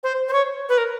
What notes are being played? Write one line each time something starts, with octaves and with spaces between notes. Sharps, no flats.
C5
C5
C#5
B4
A#4